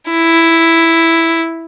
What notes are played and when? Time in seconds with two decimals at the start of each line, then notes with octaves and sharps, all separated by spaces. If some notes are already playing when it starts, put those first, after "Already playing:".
0.10 E4